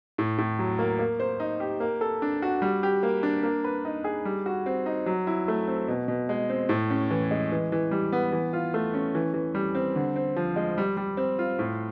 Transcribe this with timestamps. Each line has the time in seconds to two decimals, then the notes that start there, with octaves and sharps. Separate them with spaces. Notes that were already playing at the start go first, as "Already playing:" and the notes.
0.18 A2
0.38 A2
0.59 F#3
0.79 A#3
0.99 A#3
1.20 C5
1.40 D#4
1.60 G4
1.80 A#3
2.01 A4
2.22 D4
2.42 F#4
2.62 G3
2.83 G4
3.03 A#3
3.23 D4
3.43 A#3
3.64 B4
3.85 D#4
4.04 G#4
4.25 G3
4.46 F#4
4.66 C4
4.86 D#4
5.06 F#3
5.27 E4
5.48 A3
5.68 C4
5.88 B2
6.08 B2
6.29 G#3
6.49 C4
6.69 A2
6.90 C#4
7.10 E3
7.31 G#3
7.52 E3
7.72 E3
7.91 G3
8.12 B3
8.32 E3
8.53 F4
8.74 A3
8.94 C#4
9.15 E3
9.34 E3
9.55 G3
9.75 C4
9.96 D3
10.16 C4
10.36 F3
10.56 G#3
10.78 G3
10.97 G3
11.17 C4
11.39 F4
11.59 A2